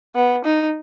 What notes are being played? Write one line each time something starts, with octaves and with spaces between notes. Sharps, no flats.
B3
D#4